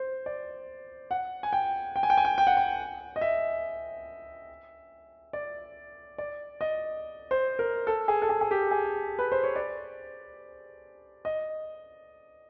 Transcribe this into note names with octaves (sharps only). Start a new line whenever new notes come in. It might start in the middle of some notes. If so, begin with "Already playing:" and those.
Already playing: C5
D5
F#5
G#5
G5
G5
G#5
G5
G#5
G5
G5
F#5
G5
D#5
E5
D5
D5
D#5
C5
A#4
A4
G#4
A4
G#4
G#4
G4
G#4
B4
C5
C#5
D5
D#5